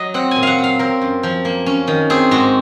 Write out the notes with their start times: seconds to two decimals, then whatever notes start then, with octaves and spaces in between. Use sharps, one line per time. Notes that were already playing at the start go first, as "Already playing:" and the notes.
Already playing: F#3 D#5
0.14 C4 F#5
0.31 A#2 G#5
0.43 F5 F#5
0.58 F#3
0.64 F5
0.79 C4 A#4
1.01 F#2
1.23 F3
1.45 A#3
1.66 C#4
1.88 D#3
2.10 C4 G#4
2.31 G#2 F#4